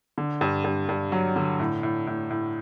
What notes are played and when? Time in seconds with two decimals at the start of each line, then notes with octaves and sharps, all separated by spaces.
0.18 D3
0.41 G2
0.64 G2
0.89 G2
1.12 F#3
1.36 D3
1.60 A2
1.83 A2
2.07 A2
2.31 A2